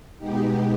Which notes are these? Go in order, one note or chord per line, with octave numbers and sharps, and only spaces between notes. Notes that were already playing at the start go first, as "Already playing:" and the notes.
B2 G#3 B3 D#4 G4